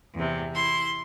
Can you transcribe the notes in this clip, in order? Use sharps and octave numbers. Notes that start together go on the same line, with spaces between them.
E2 C3
E4 C6